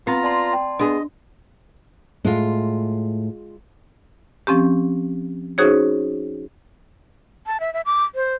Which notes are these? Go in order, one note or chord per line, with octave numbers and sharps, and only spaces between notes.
B3 C4 F4 A#5
D5 A5 C6
G5
B3 D4 G#4 D#5
A2 G#3 F4
F3 C4 C#4 G4
C#4 D#4 F#4 G#4 C5 C#5
A5
E5
E5
D6
C5